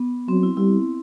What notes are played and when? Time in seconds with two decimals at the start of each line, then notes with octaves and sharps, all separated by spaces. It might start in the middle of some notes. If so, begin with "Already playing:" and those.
Already playing: B3
0.28 F#3 C4
0.43 E4
0.57 G3 E4